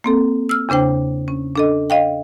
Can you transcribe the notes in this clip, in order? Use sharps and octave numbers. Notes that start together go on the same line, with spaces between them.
A#3 C4 A4
E6 F6
E2 C#3 D4 C5 G5
C#4
D4 A4 D#5
D#5 F5 G5